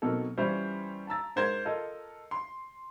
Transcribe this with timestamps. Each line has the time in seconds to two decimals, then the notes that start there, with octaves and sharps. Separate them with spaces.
0.02 B2 F#3 A#3 C4 D#4 A4
0.38 E3 G3 C#4 F4 C5
1.07 A5 A#5 E6 A6
1.36 G#2 A#4 C5 G6 G#6
1.65 F4 A4 A#4 D#5
2.31 C6